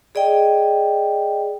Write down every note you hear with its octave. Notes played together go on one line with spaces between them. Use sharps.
G#4 D5 D#5 G5